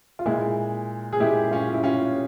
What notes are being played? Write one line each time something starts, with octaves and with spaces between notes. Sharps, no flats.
F4
A#2 G#3 E4
G#4
A#2 G#3 E4 G4
C#4 F4
E4
C#4 F4